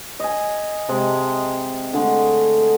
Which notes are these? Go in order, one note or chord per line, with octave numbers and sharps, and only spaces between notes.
D#5 G#5
C3 G#3 A5
D3 G#3 A3